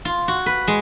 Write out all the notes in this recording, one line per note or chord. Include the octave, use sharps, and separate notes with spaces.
F4
F#4
B4
G#3